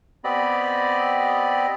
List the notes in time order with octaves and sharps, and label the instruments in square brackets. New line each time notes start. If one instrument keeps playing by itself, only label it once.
[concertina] B3 C4 G4 D5 D#5 B5